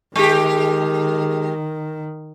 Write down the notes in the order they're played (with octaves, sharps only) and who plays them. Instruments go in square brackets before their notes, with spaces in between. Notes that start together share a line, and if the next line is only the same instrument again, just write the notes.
[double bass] D#3 [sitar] G#3 G4